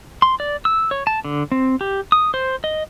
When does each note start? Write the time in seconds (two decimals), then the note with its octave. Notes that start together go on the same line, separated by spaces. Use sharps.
0.22 C6
0.40 D5
0.65 E6
0.91 C#5
1.07 A5
1.25 D3
1.52 C4
1.81 G4
2.12 D#6
2.34 C5
2.64 D#5